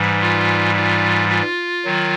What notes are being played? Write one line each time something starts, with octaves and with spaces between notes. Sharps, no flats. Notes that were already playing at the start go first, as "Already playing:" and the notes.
Already playing: G#2 E3 G3
F4
F4
F4
D#3 F#3